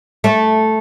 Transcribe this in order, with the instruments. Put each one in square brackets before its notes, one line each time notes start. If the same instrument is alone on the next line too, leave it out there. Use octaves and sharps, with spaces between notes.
[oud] A3